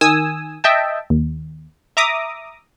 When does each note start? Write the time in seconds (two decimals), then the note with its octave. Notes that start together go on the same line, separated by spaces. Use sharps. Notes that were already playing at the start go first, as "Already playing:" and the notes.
0.01 D#3 G#5 D#6 E6
0.64 D#5 E5 G5 A5
1.10 D#2
1.97 E5 A#5 D6 D#6